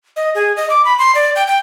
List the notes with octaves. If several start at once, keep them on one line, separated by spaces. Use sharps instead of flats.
D#5
G#4
D#5
D6
B5
C6
D5
G5
G5